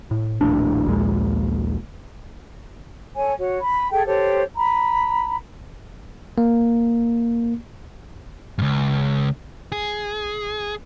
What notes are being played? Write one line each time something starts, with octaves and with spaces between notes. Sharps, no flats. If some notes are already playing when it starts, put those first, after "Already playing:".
A2
D#1 A#1 A2 D4
A#1 D#2 A#2 G#3
A4 C#5 G#5
F#4 C#5
B5
G#4 A4 G5
G4 A4 C5 C#5
A#5 B5
A#3
C#2 G2
G#4